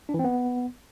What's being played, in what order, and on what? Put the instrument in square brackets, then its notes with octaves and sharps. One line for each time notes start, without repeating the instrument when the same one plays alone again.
[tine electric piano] D4
E3
C4
B3